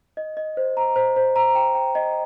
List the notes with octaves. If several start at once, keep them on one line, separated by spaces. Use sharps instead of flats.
D#5
D#5
C5
A#5
C5
C5
A#5
G5
G5
D#5